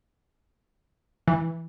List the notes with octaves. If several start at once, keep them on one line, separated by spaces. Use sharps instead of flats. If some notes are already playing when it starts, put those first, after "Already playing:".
E3